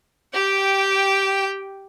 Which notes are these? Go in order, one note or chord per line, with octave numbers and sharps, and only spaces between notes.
G4 G5